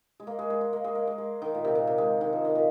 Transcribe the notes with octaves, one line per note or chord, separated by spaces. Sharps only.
G#3
A#3
G#3
G#3
G#3
A#3
G#3
A#3
G#3
G#3
D#3
A#2
C3
A#2
C3
G#3
D#3
F3
D#3
A#2